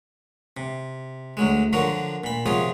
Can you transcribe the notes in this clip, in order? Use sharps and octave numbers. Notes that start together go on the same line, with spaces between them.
C3
D2 F#3 G#3
D3 F3 F#3 F#4 A#4
A#2 B5
C3 F3 F#3 F4 G#4